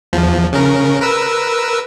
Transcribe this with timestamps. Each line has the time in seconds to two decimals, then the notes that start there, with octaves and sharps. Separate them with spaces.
0.13 E2 F3
0.53 C#3 C#4 A#4
1.01 A#4 B4 E6